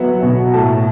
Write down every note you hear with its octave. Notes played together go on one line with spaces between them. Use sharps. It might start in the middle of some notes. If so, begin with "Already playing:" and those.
Already playing: F#3 B3 E5 F#5
B2
A2 A5